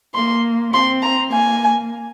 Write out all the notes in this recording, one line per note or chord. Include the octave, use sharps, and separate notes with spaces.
A#3 C6
C4 C6
A#5
A#3 G#5